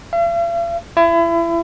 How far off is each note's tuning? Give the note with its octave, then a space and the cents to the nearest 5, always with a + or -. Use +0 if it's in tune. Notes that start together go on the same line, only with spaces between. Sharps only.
F5 -45
E4 +30